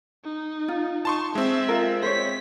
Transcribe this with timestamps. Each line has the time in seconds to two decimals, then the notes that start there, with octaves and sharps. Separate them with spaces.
0.24 D#4
0.68 F4
1.05 D#4 A5 C6 C#6
1.35 G#3 C4 E5
1.68 F4 A#4
2.03 C5 C#5 B6